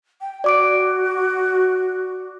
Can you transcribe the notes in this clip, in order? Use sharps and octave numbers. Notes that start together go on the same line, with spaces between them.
G5
F#4 D5 D6 D7